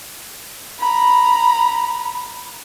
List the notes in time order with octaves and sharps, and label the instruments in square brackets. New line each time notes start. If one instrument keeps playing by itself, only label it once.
[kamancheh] A#5 B5